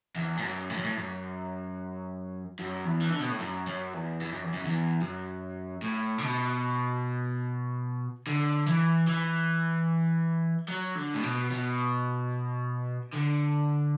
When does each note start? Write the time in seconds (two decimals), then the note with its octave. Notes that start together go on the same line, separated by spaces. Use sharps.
0.16 E2
0.37 A2
0.42 F#2
0.70 A2
0.77 F#2
0.84 A2
0.97 F#2
2.59 F#2
2.85 E2
3.01 E3
3.10 D3
3.20 B2
3.30 A2
3.39 F#2
3.67 F#2
3.93 E2
4.21 E2
4.32 F#2
4.43 E2
4.53 F#2
4.65 E2
5.01 F#2
5.82 A2
6.18 D3
6.24 B2
8.27 D3
8.67 E3
9.07 E3
10.69 F#3
10.96 D3
11.14 A2
11.23 B2
11.51 B2
13.13 D3